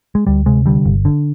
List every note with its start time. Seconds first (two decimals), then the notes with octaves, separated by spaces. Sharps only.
0.15 G#3
0.27 D2 G3
0.46 C3 G#3
0.66 D3 G3
0.85 G1
1.05 D3